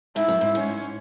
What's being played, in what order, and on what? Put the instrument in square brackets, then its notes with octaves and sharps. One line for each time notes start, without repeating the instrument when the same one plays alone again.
[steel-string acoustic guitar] G#2 [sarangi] E4
[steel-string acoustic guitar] F#2
G#2
[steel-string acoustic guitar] G#2 [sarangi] C#4